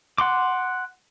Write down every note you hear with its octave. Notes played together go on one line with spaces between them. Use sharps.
F#5 C6 D6